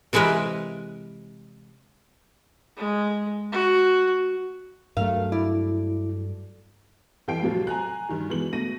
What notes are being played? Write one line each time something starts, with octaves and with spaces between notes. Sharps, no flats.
C3 E3 G#3 A#4 B4
G#3
F#4
G2 F#3 A3 A#4 F5
E4 D5
F2 E3 G3 G5 C7 D7
A2 C3 F3 F#3
G#5 A#5 F#6
G2 D#3 G3
B2 E3 G#3 F#7
B2 A3 A#6 D#7